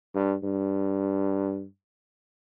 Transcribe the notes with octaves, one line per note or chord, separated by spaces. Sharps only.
G2
G2